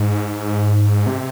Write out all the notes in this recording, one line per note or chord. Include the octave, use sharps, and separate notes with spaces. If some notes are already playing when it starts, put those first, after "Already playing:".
Already playing: G#2
C3